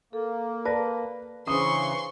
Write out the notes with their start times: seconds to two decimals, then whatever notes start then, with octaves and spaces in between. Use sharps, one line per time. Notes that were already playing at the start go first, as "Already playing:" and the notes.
0.13 A#3 A4
0.65 B4 D5 A5 A#6
1.47 C#3 E3 C#4 D4 C5 C6 C#6 D#6